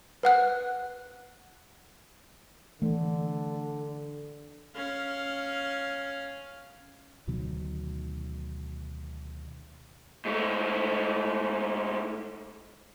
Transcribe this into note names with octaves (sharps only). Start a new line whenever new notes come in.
B4 F#5 F#6
D3 E3 A3
C#4 F5
D2 B2 D#3 F#3
G#2 A3